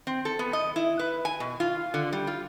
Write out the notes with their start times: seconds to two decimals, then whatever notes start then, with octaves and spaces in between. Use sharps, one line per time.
0.07 C4
0.25 A4
0.39 B3
0.53 D#5
0.76 E4
0.99 B4
1.25 G#5
1.40 B2
1.60 F4
1.94 D3
2.13 G3
2.27 F4